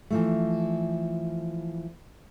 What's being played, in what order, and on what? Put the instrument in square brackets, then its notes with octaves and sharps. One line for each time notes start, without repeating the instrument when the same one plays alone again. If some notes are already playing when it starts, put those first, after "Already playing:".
[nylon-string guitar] E3 F3 A3